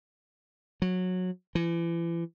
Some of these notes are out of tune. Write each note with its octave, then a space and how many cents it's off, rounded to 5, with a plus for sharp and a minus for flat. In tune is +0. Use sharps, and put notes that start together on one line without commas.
F#3 -15
E3 +35